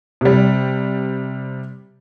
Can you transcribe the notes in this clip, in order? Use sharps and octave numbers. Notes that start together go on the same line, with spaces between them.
C3 G3